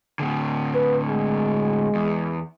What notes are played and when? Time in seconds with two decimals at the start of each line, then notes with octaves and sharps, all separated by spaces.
0.20 A2 D3
0.74 B4
1.08 G#3
1.95 E2